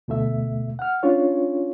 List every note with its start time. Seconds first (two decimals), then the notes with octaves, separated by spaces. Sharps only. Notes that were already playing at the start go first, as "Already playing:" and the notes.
0.08 D2 B2 A3 E5
0.79 F#5 F6
1.03 C#4 D4 F4 C#5